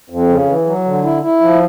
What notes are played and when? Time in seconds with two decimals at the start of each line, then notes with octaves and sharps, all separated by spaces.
0.10 F2
0.28 C#3
0.47 E3
0.66 F#3
0.85 D3
1.04 E4
1.23 E4
1.41 F3